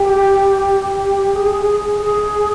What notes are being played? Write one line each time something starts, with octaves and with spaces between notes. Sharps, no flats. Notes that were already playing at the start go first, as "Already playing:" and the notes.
Already playing: G4
G#4
G#4